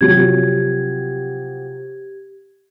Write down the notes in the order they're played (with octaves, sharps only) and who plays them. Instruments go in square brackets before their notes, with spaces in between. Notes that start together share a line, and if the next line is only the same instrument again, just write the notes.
[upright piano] C3 F3 F#3 [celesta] G4 G#6